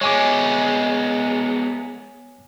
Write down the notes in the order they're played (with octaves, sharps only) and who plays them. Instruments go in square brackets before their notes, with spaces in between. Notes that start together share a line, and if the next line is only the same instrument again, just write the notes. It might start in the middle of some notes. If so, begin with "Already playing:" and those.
[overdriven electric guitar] G#3 B3 [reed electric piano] C#5 G#5 D6